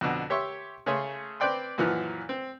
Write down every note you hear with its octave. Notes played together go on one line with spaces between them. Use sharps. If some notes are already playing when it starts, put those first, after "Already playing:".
F2 B2 D3
G4 C#5 E5 C6 C#6
C#3 A3 G#4 C#5 C6
C4 B4 C5 D5 G5 C6
F#2 A#2 E3 F3 F#5 F6
C4